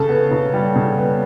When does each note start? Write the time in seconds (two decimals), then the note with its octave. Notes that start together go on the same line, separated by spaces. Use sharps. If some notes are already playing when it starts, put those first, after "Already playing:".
Already playing: C#3 A4 A5
0.09 B3
0.31 C#3
0.53 G3
0.76 C#3
0.98 B3